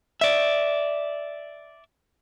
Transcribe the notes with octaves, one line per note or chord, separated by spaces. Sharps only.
D5 E5